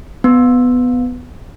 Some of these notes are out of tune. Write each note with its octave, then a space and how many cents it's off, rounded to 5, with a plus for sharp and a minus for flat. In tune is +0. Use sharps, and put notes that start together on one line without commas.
B3 +10